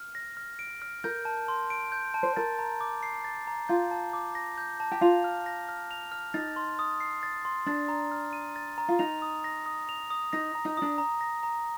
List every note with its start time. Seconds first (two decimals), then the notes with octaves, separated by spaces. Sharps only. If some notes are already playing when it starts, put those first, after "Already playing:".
Already playing: F6
0.15 A#6
0.37 F6
0.59 D7
0.82 F6
1.04 A#4 G6
1.25 A5
1.48 C6
1.70 D7
1.92 G6
2.14 A5
2.23 C5
2.36 A#4 A6
2.59 A#5
2.81 D6
3.03 C7
3.24 A6
3.47 A#5
3.69 F4 G6
3.91 A5
4.13 D6
4.35 A#6
4.58 G6
4.80 A5
4.92 G4
5.01 F4 F7
5.24 F6
5.46 A#6
5.69 F6
5.91 F7
6.12 F6
6.34 D#4 A6
6.56 C6
6.79 D#6
7.00 C7
7.23 A6
7.45 C6
7.66 D4 A6
7.89 A#5
8.11 F6
8.33 D#7
8.56 A6
8.78 A#5
8.88 F4
8.99 D#4 F7
9.22 D#6
9.44 A#6
9.66 D#6
9.89 F7
10.10 D#6
10.33 D#4 A#6
10.55 A#5
10.65 D#4
10.77 D4 D#6
10.98 A#5
11.21 A#6
11.43 A#5